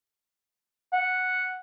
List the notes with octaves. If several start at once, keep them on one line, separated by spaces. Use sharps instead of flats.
F#5